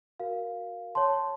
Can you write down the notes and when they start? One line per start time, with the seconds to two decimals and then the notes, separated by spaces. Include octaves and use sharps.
0.20 F#4 A#4 F5
0.95 C#5 A5 C6